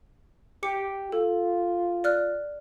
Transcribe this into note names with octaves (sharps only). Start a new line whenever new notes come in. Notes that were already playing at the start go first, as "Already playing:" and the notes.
G4 D6 C#7
F4 A4
D5 F6 F#6